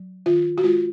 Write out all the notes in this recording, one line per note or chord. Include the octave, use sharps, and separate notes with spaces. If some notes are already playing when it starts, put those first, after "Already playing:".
Already playing: F#3
D#3 F4
F#4
G#3 F4